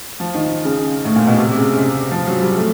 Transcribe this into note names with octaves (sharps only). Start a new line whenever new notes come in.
F3
D#3
C#3
A2
A#2
B2
C3
C3
C#3
C#3
C3
F3
F#3
G3
A3